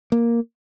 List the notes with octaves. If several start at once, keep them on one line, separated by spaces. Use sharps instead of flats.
A#3